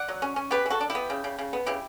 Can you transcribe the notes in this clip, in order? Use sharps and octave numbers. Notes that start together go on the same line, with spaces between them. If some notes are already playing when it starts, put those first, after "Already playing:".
Already playing: D5 F#5
F#3
C#4
C#4
B3 G4 B4
E3
F#4 A4
D4
E4 G4
B3
C#3
C#3
C#3
B3
C#3 E4 G4